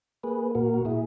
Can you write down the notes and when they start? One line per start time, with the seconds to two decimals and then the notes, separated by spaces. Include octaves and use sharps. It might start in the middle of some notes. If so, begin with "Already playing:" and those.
0.23 A#3 G#4 B4
0.55 A#2 F#4 A#4
0.74 F#4
0.85 A#2 E4 G#4